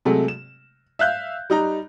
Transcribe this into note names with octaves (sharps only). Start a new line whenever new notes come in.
C3 F#3 G#3 A3
E7
E5 F5 F#6 G6
G3 D#4 A#5